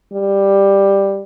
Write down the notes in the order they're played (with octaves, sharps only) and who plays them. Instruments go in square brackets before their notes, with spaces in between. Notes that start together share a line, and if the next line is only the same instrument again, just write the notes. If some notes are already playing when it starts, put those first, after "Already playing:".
[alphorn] G3